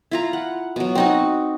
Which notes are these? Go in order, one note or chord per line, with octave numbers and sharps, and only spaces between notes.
E4 F4 A#5
F#5
B2 F#3
C4 D#4 F#4